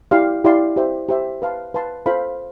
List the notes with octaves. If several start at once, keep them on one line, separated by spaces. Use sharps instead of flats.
E4 G4 D5 F5 C6
E4 G4 D5 F5 C6
G4 C5 E5
G4 C5 E5
B4 F5 A5 C6
B4 F5 A5 C6
F4 A4 C5 F5 B5